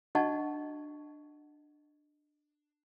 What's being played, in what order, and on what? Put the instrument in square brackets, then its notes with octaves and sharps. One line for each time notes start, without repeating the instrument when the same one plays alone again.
[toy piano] D4 F#4 D#5 F#5 A5 C#6